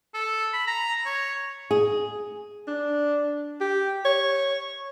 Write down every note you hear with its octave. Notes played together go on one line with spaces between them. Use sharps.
A4
B5
A#5
C#5
G#4
D4
G4
C#5